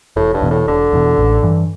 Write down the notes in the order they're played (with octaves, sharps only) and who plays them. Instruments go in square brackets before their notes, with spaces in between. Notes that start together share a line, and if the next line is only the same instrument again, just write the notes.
[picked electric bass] E1 [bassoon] A2
[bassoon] G2
[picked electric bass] E2 B2
[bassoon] A2
[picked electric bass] E1 [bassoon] D3
[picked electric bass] E2 B2
A1
G2 E3